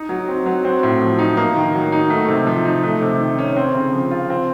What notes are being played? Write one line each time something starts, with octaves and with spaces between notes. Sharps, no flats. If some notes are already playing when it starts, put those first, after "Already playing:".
Already playing: D#4
F#3
C4
F#3
C4
A2
F3
D#4
A#3
D#3
F#3
D#4
A3
C3
F3
D#4
A3
C3
D#3
C#4
C4
C#3
F3
F4
C4